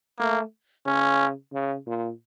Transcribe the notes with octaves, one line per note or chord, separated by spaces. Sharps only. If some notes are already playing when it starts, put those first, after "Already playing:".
A3 A#3
C#3 C#4
C#3
A#2